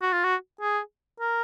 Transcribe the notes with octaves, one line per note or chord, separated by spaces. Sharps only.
F#4
F4
F#4
G#4
A#4